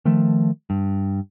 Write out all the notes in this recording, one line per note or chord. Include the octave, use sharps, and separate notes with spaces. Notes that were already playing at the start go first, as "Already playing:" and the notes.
D#3 F3 A3
G2